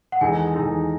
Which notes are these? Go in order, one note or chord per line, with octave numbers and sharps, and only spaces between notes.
F#5
E2 D#3 G#3 D#4 A4 G#5
E2 D#3 G#3 D#4 A4